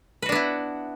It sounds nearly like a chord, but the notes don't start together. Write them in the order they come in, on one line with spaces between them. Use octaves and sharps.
B4 F#4 D4 B3 E4